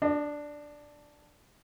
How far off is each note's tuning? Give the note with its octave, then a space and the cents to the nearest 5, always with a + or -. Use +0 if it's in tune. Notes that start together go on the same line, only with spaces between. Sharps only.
D4 +0 D#5 -45